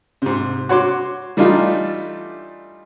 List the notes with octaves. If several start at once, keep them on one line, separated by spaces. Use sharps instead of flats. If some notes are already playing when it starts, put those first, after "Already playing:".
G#2 C3
F#4 C#5 C6 D6
E3 G3 A3 D4 D#4 F4